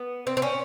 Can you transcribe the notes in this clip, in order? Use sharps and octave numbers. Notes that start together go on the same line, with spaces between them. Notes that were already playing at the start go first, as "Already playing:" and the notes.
Already playing: B3
C4
C4
C#4